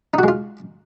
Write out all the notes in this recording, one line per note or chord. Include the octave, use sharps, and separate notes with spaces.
G#3 D#4 F4 F#4